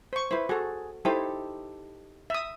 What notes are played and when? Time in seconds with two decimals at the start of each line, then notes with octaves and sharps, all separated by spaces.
0.13 C5 C#6
0.31 E4 B4 C5
0.49 F#4 G#4 A4
1.05 D#4 E4 G4 A4 C5
2.30 E5 D#6